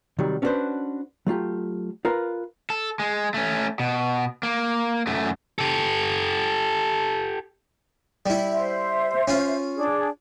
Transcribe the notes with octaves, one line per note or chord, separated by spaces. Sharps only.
C3 D#3 F#3 G3
C#4 D4 F#4 G4 B4 C5
F#3 A3 F4 G4
F4 A#4 B4 F5
A4
G#3
A3 C#4
B2
A#3
F#2 A3
G4 A4
G3 E4
C5 E5
C#4 F4
D4 G#4